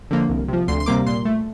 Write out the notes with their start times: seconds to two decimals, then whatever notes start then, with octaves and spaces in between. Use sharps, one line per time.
0.11 D3 F3 A#3
0.29 C2
0.48 C3 F3
0.68 D2 C6
0.80 C6
0.86 C3 G3 A#3 D6
1.07 A#2 C6
1.25 A3